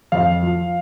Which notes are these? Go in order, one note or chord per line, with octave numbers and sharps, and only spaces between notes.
F2 F5
F3